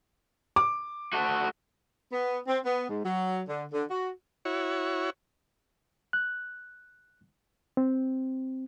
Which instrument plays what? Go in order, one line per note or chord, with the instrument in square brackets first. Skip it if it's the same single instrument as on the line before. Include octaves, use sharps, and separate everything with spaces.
[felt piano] D6
[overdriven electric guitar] A3 F#4
[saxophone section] B3
C4
B3
G#2
F#3
D3
D3
F#4
[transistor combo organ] E4 F#4 C#5
[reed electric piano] F#6
C4